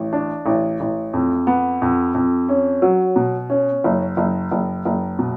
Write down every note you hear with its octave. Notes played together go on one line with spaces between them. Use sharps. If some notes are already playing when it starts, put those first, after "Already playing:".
Already playing: A1
D4
A1
A1
F2
B3
F2
F2
C#4
F#3
B2
C#4
F#1
F#1
F#1
F#1
B2